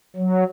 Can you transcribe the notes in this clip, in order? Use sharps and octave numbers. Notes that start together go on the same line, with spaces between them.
F#3